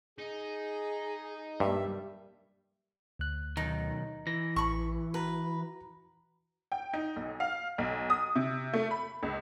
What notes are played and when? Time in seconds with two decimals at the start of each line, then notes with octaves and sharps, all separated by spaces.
0.18 D#4 G#4
1.60 G2 G3 A#3 E5
3.19 D2 F#6
3.57 B1 D#3 D#4
4.27 E3 A#6
4.56 A1 B5 C#6
5.14 F#4 B4 A#5
6.72 G5
6.93 D#4
7.16 B1
7.40 F5
7.78 B1
8.10 D#6
8.36 C3
8.73 A3
8.91 B5
9.23 C#2